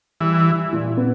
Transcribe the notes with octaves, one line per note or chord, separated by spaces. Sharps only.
E3 G3
E4
A#2
B3